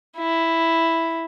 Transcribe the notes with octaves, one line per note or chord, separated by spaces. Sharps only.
E4